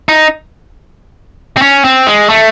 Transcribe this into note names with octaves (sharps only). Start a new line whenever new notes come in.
D#4
C4
C#4
C4
G#3
A3